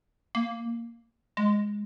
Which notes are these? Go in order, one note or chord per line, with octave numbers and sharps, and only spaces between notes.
A#3
G#3